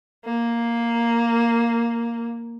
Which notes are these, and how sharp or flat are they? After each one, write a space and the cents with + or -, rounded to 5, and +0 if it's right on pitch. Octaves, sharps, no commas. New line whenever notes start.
A#3 +0